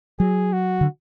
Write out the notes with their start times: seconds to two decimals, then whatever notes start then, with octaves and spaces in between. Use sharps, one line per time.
0.19 F#3 G#4
0.53 F#4
0.81 D3